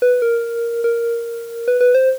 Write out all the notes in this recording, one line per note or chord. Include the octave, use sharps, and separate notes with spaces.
B4
A#4
A#4
B4
B4
C5